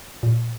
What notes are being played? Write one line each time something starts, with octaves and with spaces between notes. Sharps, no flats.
A#2